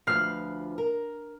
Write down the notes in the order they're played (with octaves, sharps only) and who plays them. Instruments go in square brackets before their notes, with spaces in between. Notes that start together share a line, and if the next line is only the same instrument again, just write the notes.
[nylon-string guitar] D2 F3 B4 [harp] F6 C7
[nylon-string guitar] A#4